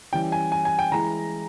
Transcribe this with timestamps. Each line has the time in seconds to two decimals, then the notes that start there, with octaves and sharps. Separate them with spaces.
0.12 E3 G3 C#4 E4 G5
0.32 G#5
0.52 G#5
0.65 G#5
0.79 G5
0.92 E3 G#3 E4 A#5